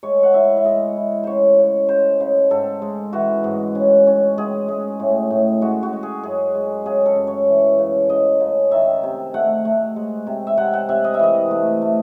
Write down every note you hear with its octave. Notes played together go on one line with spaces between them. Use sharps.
G#3 C#5
F#5
E4 E5
E5
G#3 D#5
E4
C#3 C5 C#5
C#3
C#3 C5
C#3
G#2 A4
G#3
E3 F#4
G#2
C#4
C#4
G#3 G#4
G#3
A2
A2
G#3 F#4
F#4
G#3
G#4
F#2 G#4
G#3
C#3 G#4
A4
F#2
C#5
E3
C#3
C#3 D#5
C#3
D#3 E5
C3
A3 F#5
A3
G#3
C3
E5
C3 F#5
F#5
C3 E5
D#5
E5
E3 D#5
A3
A3